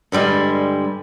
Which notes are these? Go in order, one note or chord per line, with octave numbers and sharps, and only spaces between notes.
G2 D3 G3 G#3